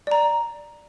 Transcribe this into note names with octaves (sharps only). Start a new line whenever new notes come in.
D5 A#5